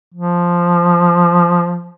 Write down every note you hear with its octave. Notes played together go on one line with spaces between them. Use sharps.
F3